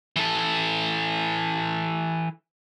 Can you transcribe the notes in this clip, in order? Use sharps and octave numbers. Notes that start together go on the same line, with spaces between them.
E3 A4